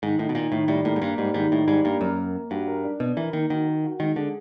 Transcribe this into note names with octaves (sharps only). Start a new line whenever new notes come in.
G#2 D#3
A2 D#4
B2
A#2 D#4
A2 D#3
A2 G3
A2 A#3
G#2
G2 A#3
G#2 G3
G#2 D#3
A2 D#4
G#2 G3
G2 A#3
F#2 A#4
A#4
A#3
G2 F#4
A#4
D4
B2 D4
E3 A#4
D#3 A#3
D#3 F#4
A#4
F#4
D#3 G#3
D3 G#4